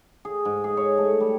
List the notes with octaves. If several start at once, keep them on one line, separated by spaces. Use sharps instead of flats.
G#4
G#2
G#4
C#5
A3
G3